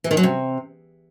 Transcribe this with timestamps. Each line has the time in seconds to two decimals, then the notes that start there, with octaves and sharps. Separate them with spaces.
0.04 E3
0.11 D#3
0.17 F#3
0.23 C3